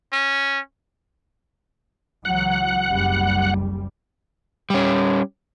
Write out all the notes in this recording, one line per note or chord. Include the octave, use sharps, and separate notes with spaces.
C#4
C#2 E3 F#3 F#5
F#1 C2 G3
G3 C#4